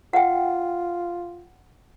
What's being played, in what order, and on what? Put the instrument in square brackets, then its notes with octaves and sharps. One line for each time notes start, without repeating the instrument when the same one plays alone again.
[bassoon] F4 [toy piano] F#5 G5